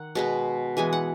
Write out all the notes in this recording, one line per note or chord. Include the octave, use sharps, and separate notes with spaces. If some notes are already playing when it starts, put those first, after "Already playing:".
Already playing: D#3 F#5
B2 G#3 B3
E3 G#3 B3 G#5
F#5